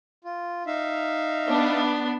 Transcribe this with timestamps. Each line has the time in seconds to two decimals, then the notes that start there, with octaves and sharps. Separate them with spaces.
0.24 F4
0.67 D#4 E5 F5
1.47 B3 D4